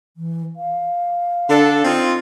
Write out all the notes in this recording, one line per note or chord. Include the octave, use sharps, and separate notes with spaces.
E3
F5
D3 D4 A4
C4 D#4 F4